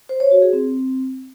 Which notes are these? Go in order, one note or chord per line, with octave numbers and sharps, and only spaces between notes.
C5
C#5
F#4
G#4
C4